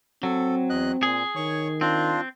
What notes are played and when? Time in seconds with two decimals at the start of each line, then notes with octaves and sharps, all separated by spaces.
0.23 F#3 C4 A4
0.70 E2 D#5 F#6
1.03 A#2 G#4
1.36 D#3 C#5 C#6
1.81 C4 D4 F4